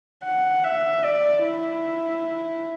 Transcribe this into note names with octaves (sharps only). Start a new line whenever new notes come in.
F#5
E5
D5
E4